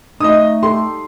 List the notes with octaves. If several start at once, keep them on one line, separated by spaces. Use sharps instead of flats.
A3 D#4 D#5 D#6
G4 A4 C6